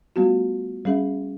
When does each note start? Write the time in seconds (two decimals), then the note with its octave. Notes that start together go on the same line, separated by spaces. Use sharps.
0.16 G3 A3 B3 F4 F#4
0.85 G3 C#4 G#4 E5